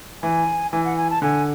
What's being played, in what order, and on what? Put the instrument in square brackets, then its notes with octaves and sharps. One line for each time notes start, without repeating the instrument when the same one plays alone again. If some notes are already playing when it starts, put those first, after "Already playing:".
[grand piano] E3 [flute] G#5
[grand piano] E3 [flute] G#5
[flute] F#5
G#5
A5
[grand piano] D3 [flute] G#5